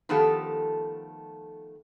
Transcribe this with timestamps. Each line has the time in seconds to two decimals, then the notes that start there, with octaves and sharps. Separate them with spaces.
0.09 D#3 F3 A3 B3 G4 A4